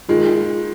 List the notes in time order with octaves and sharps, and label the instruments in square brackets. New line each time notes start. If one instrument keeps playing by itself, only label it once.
[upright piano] D#3 G#3 [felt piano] F4
[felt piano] F4